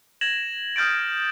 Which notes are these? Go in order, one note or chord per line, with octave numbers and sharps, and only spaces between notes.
G#6 A#6 E7 F#7
D#6 F6 G6 A6 D7